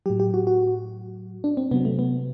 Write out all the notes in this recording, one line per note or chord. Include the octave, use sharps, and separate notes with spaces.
A2 F#3 G4
G4
F#4
F#4
D4
C4
C3 F#3 B3
A3
B3